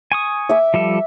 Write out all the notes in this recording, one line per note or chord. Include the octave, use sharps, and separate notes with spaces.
G#5 C#6 D#6
E5 D6
F3 G3 A4